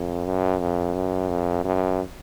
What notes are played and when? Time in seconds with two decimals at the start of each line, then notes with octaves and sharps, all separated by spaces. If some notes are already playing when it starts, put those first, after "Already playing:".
Already playing: F2
0.26 F#2
0.60 F2
0.94 F#2
1.29 F2
1.64 F#2